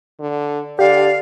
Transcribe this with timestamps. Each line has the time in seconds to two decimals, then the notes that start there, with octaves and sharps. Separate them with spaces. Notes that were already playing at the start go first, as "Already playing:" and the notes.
0.20 D3
0.79 D3 G4 D5 F5